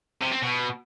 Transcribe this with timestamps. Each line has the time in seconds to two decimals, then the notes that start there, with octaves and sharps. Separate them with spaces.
0.22 C3
0.32 C4
0.42 B2